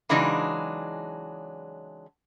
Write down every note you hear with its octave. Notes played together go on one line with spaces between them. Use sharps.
C#3 E3 F#3 G#3 D4 D#4